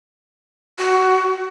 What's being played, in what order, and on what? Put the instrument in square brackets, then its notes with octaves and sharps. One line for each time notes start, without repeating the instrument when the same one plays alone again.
[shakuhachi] F#4